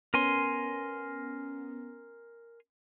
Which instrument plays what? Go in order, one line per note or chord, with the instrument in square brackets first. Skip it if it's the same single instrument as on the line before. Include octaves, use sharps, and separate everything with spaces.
[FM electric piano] B3 C#4 [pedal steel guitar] A#4 G#5 C6